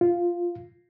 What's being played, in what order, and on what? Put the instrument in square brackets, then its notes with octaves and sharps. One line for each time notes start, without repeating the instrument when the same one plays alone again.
[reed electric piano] F4